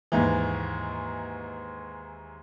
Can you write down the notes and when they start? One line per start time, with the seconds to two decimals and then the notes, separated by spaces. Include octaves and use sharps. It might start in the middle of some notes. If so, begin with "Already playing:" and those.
0.12 D#2 G#2 E3